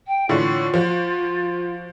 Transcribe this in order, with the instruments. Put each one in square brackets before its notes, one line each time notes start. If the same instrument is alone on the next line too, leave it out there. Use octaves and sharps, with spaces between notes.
[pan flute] G5
[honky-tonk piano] A2 D3 E3 [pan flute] F4
[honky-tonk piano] F3 F#4